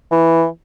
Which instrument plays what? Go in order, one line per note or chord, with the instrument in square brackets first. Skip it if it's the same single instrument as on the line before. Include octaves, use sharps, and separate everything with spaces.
[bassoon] E3